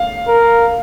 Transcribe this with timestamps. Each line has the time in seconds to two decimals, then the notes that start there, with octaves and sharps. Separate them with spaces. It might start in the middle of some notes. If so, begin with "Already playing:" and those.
Already playing: F5
0.28 A#4